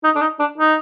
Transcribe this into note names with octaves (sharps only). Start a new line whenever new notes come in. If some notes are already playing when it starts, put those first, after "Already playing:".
D#4
D4
D#4
D4
D#4